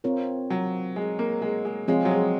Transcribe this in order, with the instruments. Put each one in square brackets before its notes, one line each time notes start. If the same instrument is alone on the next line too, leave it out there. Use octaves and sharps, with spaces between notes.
[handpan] C4 F4 A#4 C#5
[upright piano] F#3
G#3
A#3
G#3
G#3
[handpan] F3 C4 F4 G#4 C#5 [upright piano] G#3
[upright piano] F#3
G#3